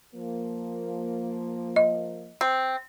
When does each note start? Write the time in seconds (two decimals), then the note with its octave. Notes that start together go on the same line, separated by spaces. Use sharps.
0.15 F3 A#3
1.76 D#5
2.41 C4